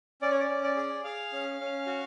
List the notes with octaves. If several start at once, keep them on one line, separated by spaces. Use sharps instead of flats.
C#4 D5
C#5
D5
C#4
D5
G#4
G#4 F5
C#4
C#4
F#4